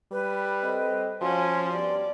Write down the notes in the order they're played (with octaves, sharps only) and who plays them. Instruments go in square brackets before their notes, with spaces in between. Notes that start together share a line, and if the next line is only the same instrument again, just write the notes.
[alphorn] G3 [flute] B4
[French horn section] C4 A4 D#5
[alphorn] F3 [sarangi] C#4 [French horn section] F#4 [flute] C6
[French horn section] G2 B3 G4 [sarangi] D5